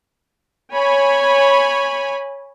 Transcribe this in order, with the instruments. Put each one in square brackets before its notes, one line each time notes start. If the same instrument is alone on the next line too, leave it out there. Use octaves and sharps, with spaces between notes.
[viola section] C#5 G#5 B5